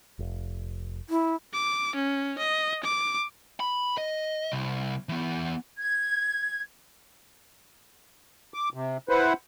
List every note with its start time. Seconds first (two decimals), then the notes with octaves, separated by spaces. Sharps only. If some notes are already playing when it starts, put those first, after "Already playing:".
0.19 F1
1.09 E4
1.53 D6
1.96 C#4
2.39 D#5
2.84 D6
3.60 B5
3.98 D#5
4.52 C2
5.09 E3 B3
5.77 G#6
8.54 D6
8.74 C3
9.09 E4 B4 C5 F#5